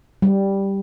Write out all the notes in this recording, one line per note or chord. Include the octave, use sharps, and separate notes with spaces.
G3